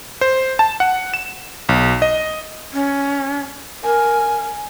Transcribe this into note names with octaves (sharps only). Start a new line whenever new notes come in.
C5
A5
F#5
E7
B1
D#5
C#4
A#4 G#5